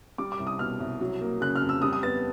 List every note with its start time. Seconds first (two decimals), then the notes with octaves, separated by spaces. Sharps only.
0.18 G3 D6
0.32 D6
0.39 C2
0.47 D#6
0.59 B2 F6
0.80 C2
1.01 F#3
1.21 A#3
1.41 C#3 F#6
1.56 F6
1.62 F2
1.69 E6
1.82 G3 D#6
1.93 D#6
2.03 B3 A6